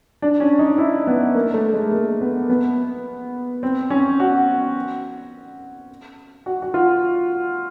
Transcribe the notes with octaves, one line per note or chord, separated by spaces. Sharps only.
D4
C#4
D#4
E4
B3
A#3
A3
G#3
A#3
B3
B3
C4
C#4
F#4
F#4
F#4
F4